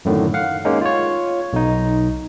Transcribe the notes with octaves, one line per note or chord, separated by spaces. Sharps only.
F#2 A2 D3 D#3
F5 F#5
G#3 A#3 C#4 D#4
F4 C#5
B1 D#4